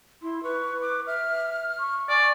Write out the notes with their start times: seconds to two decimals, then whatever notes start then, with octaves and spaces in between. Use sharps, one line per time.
0.22 E4 C6
0.43 B4 C#6
0.81 D6
1.07 E5 F6
1.79 C#6
2.09 D5 G#5